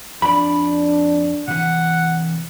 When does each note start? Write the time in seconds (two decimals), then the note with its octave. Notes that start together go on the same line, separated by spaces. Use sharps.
0.22 F2 D4 D5 B5
1.48 C3 E3 F#5